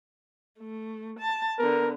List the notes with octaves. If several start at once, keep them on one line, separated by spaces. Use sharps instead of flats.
A3
A5
D3 B3 A#4